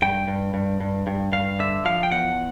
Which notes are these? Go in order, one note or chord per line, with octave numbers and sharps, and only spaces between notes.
G2 G5
G2
G2
G2
G2
G2 F5
D3 E5
F3 F5
G5
E2 F#5